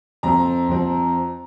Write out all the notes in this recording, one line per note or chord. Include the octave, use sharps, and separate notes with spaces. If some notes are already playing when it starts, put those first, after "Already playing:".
F2 F3 C4 A#5
F2 F3 C4